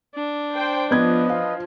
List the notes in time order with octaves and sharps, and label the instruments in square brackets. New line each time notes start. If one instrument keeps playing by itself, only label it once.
[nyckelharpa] D4
[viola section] C5 G5
[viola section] F3 [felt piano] B3 G#6 [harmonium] B4 D#5
[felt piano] F5